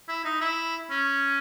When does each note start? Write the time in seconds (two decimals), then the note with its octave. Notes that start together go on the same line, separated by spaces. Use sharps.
0.08 E4
0.25 D#4
0.41 E4
0.90 C#4